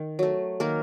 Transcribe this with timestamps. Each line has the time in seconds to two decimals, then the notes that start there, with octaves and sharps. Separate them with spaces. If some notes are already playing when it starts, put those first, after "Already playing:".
Already playing: D#3
0.19 F#3 A3
0.60 D#3 A#3 A#4